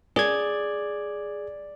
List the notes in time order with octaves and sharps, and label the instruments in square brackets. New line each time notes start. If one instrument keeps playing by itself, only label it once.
[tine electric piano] G#4 G#6 [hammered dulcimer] D5